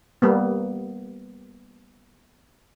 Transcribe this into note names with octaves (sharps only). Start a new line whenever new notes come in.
G3 A#3 B3